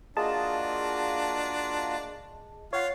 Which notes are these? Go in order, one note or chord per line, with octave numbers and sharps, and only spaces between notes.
A#3 D4 F4 F#4 G#4 D#5 A5
F4 C#5 F#5 C7